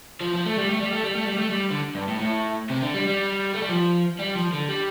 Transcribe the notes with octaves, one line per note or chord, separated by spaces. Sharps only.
F3
F3
A3
G3
A3
G3
A3
G3
A3
G3
A3
G3
D3
G2
A2
A2
C3
D3
G3
G3
A3
G3
F3
G3
F3
D3
G3